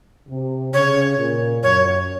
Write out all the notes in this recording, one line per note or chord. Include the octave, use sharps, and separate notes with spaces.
C3
C#3 C#5
A#2
F#2 C#5